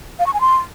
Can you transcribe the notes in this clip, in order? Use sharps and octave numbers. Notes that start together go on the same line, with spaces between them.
F5
C#6
G#5
C6